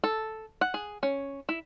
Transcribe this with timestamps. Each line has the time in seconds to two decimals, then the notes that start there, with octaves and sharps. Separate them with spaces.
0.04 A4
0.61 F#5
0.74 G#4
1.03 C#4
1.49 E4